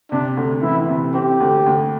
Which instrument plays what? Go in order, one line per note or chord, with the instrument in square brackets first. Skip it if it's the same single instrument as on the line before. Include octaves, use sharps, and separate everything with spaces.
[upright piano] C3 [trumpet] D4
[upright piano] D2
[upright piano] E3 [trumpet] E4
[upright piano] C3
[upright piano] C4 [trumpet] G4
[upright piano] D2
D2